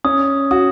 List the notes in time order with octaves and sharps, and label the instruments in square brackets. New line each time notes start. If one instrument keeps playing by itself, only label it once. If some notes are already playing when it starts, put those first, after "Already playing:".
[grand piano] C#4 [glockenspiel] D#6
[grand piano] F#4 [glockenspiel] D#6